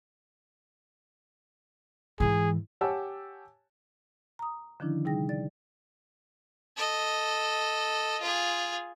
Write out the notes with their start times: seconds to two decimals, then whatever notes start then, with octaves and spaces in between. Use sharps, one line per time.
2.20 G#2 E3 G#4
2.81 G4 C#5 F#5 G#5 A5 E6
4.39 A#5 D#6
4.80 D3 D#3 F3 C#4 D4 E4
5.05 C3 G3 D#4 G#4 G5 A#6
5.29 D5 A6
6.77 A4 D#5
8.22 F4 G#4